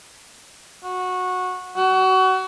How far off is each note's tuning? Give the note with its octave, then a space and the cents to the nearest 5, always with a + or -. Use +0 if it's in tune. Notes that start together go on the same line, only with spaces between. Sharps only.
F#4 -15
F#4 +25